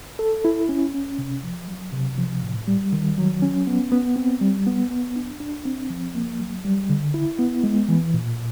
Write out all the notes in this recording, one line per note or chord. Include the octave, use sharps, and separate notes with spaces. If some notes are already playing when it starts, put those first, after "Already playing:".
A4
E4
C#4
C#4
C3
F3
F#3
C3
F3
A2
G3
D#3
F#3
C#4
B3
B3
C4
G3
B3
B3
D4
D4
C4
F3
A#3
F#3
G3
D3
E4
B3
G#3
E3
A#2